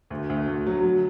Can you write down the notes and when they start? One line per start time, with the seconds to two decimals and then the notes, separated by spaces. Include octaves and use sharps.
0.10 D2
0.30 D2
0.48 D2
0.67 F#3
0.84 F#3